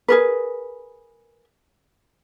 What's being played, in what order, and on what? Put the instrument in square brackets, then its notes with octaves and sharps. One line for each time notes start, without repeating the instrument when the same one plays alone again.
[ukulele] G#4 A#4 B4